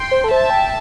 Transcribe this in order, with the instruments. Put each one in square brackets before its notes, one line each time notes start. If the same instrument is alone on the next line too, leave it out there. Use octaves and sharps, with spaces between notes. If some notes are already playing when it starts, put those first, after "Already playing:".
Already playing: [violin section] G5 C6
[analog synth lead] C5
A4
[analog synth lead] C5 [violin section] E5 A5
[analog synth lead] G5